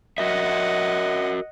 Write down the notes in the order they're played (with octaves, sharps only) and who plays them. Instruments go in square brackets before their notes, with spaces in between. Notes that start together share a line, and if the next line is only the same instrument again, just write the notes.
[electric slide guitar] F#4 A#4 E5 [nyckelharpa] D#5 F#5